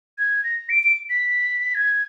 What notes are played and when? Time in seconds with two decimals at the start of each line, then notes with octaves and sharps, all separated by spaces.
0.18 G#6
0.44 A#6
0.69 D7
0.83 D7
1.10 B6
1.75 G#6